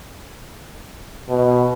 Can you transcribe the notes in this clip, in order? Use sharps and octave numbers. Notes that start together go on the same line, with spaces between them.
B2